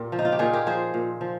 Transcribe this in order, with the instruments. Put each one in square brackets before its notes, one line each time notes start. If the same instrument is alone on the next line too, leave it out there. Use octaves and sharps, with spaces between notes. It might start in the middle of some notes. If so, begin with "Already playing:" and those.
Already playing: [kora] A#2 G4 A#4
F3
D#4
F4
G4
A#2 F4 G#4
G4 A#4
F3 G#4 C5
A#2
F3